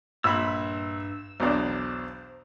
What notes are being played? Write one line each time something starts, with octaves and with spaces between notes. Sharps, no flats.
A#1 G2 B5 E6
B1 E2 D4 C5